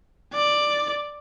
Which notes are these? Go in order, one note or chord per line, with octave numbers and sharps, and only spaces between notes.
D5